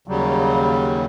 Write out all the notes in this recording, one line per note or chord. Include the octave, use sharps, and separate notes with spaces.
D#2 C#3 F#3 G3